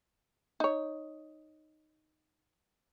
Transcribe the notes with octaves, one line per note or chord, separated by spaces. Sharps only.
D#4 C#5